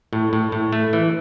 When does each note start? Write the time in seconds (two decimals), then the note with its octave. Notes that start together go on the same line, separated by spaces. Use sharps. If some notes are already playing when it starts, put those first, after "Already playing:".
0.13 A2
0.33 A2
0.52 A2
0.73 A3
0.93 E3